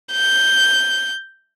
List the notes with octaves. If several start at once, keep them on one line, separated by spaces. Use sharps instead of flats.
G6